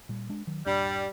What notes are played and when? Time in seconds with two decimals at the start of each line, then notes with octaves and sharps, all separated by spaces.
0.09 A#2 G3
0.29 G#3 D4
0.47 D#3 F#3
0.66 D#1 G2 G3 D4